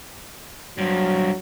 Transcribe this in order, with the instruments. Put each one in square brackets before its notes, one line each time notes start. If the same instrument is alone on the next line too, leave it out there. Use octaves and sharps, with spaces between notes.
[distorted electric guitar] G2 F3 [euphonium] F#3